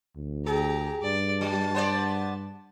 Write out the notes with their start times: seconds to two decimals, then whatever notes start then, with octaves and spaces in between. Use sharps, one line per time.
0.16 D2
0.46 G4 G#4 A#5
1.02 G2 D5
1.41 F#3 A5
1.74 B3 C5 D5